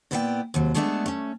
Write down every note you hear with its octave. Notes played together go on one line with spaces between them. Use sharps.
A#2 B3 E4 D5 E5 G5
D#2 C3 F#3
G#3 A3 B3 D4 C5 E5
A3 C#4